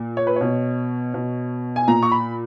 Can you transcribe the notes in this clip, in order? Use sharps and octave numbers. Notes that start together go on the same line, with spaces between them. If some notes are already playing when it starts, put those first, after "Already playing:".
Already playing: A#2
C#5
B4
B2 C#5
B2
G#5
A#2 A#5
C#6
B5